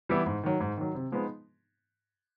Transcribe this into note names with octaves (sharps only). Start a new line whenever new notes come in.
E3 G3 B3 E4
G#2
D#3 F#3
G#2
D#3 F#3
C3
F3 G#3 B3 D#4